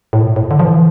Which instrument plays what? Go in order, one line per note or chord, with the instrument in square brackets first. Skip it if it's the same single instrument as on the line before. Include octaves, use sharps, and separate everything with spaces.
[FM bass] A2
A#2
A2
D3
F3
E3